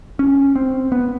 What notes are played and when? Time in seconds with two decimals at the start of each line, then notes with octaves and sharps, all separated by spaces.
0.19 C#4
0.55 C4
0.92 B3